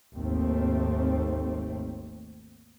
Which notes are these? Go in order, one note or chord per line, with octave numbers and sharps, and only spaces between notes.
G#1 D#2 A3 C4